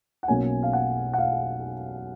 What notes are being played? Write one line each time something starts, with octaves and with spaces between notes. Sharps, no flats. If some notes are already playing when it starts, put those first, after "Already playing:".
F#5
B1 B2 A#3 C#4 G#5
F5
F#5
F#5
F5